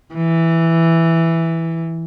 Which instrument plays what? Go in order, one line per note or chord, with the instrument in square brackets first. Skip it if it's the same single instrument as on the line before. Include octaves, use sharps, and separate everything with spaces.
[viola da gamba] E3